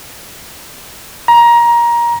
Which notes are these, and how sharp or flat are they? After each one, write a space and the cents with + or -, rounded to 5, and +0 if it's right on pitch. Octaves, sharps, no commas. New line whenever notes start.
A#5 +20